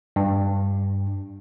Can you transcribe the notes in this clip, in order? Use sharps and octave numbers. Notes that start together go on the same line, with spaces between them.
G2